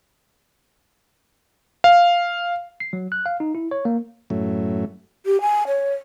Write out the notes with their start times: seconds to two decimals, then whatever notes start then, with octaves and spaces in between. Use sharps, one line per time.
1.84 F5
2.80 C7
2.93 F#3
3.12 F#6
3.26 F5
3.40 D#4
3.55 E4
3.71 C#5
3.85 A#3
4.30 F#2 A2 F#3 A3
5.26 G4
5.41 G#5
5.67 C#5